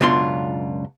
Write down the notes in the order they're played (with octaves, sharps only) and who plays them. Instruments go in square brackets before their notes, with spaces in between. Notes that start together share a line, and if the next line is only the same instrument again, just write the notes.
[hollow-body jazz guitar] C#2 F#2 B2 D4 F4 C6